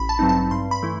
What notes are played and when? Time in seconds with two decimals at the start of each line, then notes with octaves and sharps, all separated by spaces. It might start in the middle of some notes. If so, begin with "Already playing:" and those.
Already playing: A1 B5
0.09 A5
0.19 G2 F#3 C4 D#4
0.29 A5
0.51 G2 C6
0.71 B5
0.82 E3 A3 E4